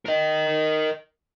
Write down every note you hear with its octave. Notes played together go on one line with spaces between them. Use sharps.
A#4 D#5